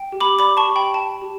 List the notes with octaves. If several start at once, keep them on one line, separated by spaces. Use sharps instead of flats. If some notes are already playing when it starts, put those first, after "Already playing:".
Already playing: G5
G4
B5 D6
D5 B5 D6
A5 C#6
G4
G5 B5
G5 A5
G4